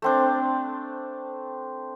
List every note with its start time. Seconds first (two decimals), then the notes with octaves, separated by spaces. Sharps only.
0.02 A3 C4 D4